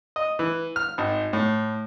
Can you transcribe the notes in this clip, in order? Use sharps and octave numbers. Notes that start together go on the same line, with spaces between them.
D#5
E3
F6
G#1
A2